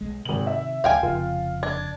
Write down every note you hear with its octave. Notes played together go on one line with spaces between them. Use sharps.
B1 G#3
G#1 C3 D#3 F#7
E5
D2 B2 F#3 F5 G5 G#5
F1 F2 C#3 F4
D4 G#6